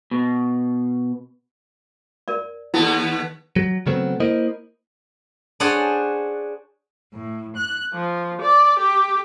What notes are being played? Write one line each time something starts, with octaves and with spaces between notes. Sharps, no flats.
B2
A#4 D5
D#2 B3 E4 A4 A5
F#3
C#3 F#3 A3 B3 C4
A#3 E4 A#4 C5 D#5
D4 G#4 C5 C#5 F#5 A5
A2
F#6
F3
D5
G4